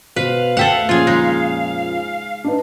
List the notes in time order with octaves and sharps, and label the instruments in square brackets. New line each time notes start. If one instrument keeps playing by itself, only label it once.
[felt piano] B2 C5 [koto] B4 [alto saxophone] F5
[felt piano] D2 G5 A5 [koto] A4 E5 F#5
[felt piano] F2 A#2 C#3 [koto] F4 G#4
[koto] G#3 D#4
[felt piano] D4 D#4 B4